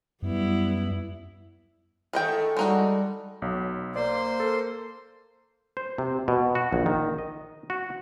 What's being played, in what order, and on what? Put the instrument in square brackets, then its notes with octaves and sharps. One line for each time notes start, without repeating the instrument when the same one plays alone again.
[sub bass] F#2 [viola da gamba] G3 B3 E4
[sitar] D#3 A3 [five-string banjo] G#4 D#5 G5
[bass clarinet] G3 [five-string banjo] G#3 D#4 F#4
[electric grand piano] B1 F#3
[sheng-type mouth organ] A#3 C5 C6 [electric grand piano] D5
[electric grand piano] A4 A#4
[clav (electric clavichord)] C5
C3
B2
F#4
A#1
D#3
D#5
F#4